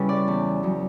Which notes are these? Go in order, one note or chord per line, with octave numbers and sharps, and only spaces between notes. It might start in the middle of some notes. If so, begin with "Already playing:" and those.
Already playing: C#3 G3 C#4 E4 B4
D5
E2
C#3 F#3